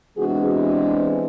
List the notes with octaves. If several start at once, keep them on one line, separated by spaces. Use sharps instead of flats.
C3 E3 G#3 B3 D4 F#4 G#4